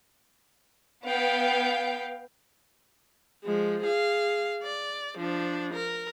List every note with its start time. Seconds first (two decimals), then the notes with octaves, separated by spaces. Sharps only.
1.05 B3 F5 G5
3.44 F3 G#3
3.82 G#4 F5
4.63 D5
5.18 F3 D4
5.74 A#4